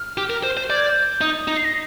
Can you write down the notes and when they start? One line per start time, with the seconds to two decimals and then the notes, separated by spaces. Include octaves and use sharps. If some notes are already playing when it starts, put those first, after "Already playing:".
Already playing: F6
0.17 G4
0.30 A#4
0.43 C5
0.57 C5
0.69 D5 G6
0.76 G#6
0.84 G6
1.21 D#4 D#6
1.48 D#4
1.57 C7
1.65 A#6